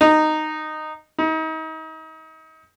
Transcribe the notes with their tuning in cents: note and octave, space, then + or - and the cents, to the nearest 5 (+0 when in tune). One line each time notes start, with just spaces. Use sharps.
D#4 -10
D#4 +35